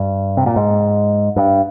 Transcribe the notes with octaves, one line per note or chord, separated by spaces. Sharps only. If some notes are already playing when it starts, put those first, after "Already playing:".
Already playing: G2
C3
A#2
G#2
G2